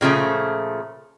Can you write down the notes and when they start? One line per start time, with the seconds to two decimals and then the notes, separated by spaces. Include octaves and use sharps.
0.01 A#2 C#3 F3 A3